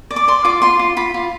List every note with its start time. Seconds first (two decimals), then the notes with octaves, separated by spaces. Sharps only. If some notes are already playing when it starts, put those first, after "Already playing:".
0.11 D5
0.16 D6
0.28 D5 C6
0.45 F4 D6
0.62 F4 C6
0.79 F4
0.97 F4 B5
1.14 F4